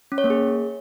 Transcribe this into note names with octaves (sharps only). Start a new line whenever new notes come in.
C#4
C#5
A#3
G#4